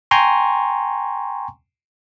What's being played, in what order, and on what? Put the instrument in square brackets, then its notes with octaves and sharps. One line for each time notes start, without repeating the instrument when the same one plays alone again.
[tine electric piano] G5 G#5 A#5 C6 C#6